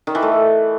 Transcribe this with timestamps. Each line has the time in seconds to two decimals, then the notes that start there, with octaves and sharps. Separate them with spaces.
0.07 D#3
0.15 E3
0.23 A3